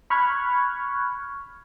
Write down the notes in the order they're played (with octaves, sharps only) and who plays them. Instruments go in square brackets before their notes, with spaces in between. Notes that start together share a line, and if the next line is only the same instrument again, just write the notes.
[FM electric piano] B5 C#6 F6 F#6 G#6